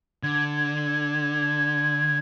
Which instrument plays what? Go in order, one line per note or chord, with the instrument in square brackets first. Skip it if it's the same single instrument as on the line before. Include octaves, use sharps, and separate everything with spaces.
[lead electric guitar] D3 [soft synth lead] G#6